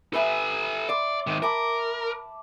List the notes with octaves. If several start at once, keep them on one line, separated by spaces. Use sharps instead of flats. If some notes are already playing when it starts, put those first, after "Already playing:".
A4 B4 E5 G#5 B5
D5 C6 D6
G#2 D#3
A#4 A5 B5 D6